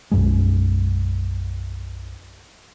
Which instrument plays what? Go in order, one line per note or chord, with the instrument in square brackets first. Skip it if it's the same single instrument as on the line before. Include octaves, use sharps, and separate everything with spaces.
[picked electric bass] B1 F#2 G#3